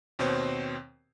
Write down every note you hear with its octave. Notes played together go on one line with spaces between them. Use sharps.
D#2 B2 C4 C5 C#5 C6